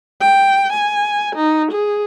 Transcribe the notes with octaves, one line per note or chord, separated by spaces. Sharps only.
G5
G#5
D#4
G#4